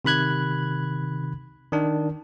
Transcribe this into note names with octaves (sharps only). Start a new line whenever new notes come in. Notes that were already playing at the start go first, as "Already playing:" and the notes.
C3 D#3 B5 F#6 G#6
D#3 D4